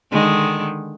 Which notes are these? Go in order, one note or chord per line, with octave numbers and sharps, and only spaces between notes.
D3 D#3 G#3